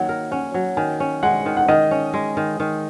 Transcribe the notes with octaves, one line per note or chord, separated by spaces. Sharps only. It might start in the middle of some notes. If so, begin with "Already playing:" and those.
Already playing: D#3 F#3 A#3 F#5
A#4
C#4 F#5
F#3
D#3 G#5
C#4
G#3 F#5
D#3
F#5
D#3 D#5
C#4
G#3
D#3
D#3